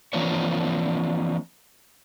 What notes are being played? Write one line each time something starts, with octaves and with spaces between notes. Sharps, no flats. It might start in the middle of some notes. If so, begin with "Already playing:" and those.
E3 F3 A#3 C4 D4 C#5